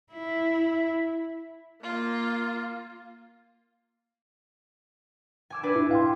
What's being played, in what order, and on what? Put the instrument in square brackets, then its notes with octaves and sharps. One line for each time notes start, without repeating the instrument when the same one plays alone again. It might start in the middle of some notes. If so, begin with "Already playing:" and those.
[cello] E4
[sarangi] A#3 [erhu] F4
[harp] G#5 D6 E6
D4 B4 G#5
[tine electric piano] E4
F5 G5 C6